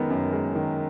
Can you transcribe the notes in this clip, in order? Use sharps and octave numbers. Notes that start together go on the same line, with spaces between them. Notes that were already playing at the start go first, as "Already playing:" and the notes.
Already playing: F#2 D#3 G#3 B3
F#2
G#3
D#3